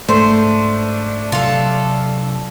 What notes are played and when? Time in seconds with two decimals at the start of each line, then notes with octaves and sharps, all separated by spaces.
0.09 G#2 A3 D4 C5
1.32 C3 F#3 F4 A4